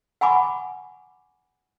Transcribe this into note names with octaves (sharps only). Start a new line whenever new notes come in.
F#5 G#5 A#5 B5 C#6 D6